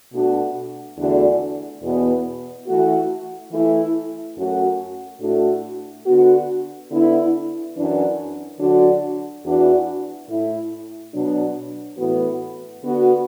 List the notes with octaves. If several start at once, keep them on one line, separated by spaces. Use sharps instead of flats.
B2 A3 D4 F#4
E2 D3 A3 D4 F#4
E2 B2 B3
E3 A3 F#4
E3 A3 E4
F#2 F#3 A3 F#4
A2 A3 D4 F#4
D3 B3 F#4
D3 B3 E4
F#2 E3 D4
D3 F#3 D4 F#4
E2 E3 D4 F#4
A2 A3 E4
B2 F#3 B3 D4
A2 E3 B3 F#4
D3 B3 F#4